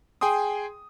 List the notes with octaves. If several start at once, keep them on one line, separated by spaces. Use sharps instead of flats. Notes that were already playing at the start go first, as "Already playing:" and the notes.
G#4 G5 G#5 C6 D#6